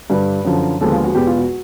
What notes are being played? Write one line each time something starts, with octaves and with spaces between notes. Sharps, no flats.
G2 D3 G3 B4
F#2 D3 F3
D#2 D3 F3 G#3 B3 A4
F4
F#4
E2 B2 G#3 B3 G4
F4
F#4